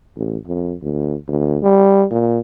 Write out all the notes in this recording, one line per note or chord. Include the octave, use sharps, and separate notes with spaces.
A1
F2
D2
D2
G3
A#2